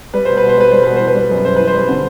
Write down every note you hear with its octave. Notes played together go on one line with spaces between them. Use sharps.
G3 B4
B2 C5
B4
B2
C5
G3 B4
G3 C5
B2 B4
E3 C5
B4
G3
F#2
F#2 C5
E3 B4
C5
G3
D3